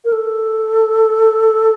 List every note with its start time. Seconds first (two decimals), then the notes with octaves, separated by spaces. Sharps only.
0.05 A#4
0.12 A4